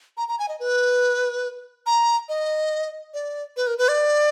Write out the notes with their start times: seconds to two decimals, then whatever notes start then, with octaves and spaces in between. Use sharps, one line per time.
0.17 A#5
0.28 A#5
0.39 G#5
0.49 D#5
0.60 B4
1.86 A#5
2.29 D#5
3.14 D5
3.57 B4
3.67 A#4
3.78 B4
3.88 D5